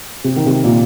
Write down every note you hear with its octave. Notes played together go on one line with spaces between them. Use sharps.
C3
D#3
C3
A#2